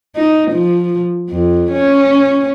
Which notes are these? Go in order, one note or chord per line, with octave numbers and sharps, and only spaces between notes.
D#4
F3
F2
C#4